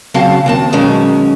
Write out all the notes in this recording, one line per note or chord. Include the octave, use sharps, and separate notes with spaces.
C#3 F#3 C4 C#4 F5 A5
D#2 C4 A5
B2 D#3 F#3 G#3 C#4